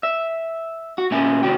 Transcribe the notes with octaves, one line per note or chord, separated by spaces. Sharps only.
E5
F#4
A#2 C#4 E5 G#5
D#2 C3 F#4 G5